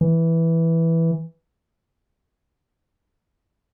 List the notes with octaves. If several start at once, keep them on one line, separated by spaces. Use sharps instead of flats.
E3